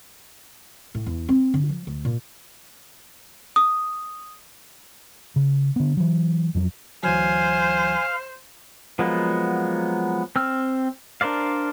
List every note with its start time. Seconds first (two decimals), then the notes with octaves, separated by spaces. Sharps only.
0.95 A2
1.06 E2
1.29 C4
1.54 D3
1.69 F3
1.87 D2
2.05 A#2
3.56 D#6
5.36 C#3
5.76 D3 B3
5.97 E3 F#3
6.55 F2 F#3
7.03 D2 E3 F#3 C5 F5 G#5
8.99 F3 F#3 G#3 A#3 B3
10.36 C4 E6 F6
11.21 D4 A#4 C5 D5 F5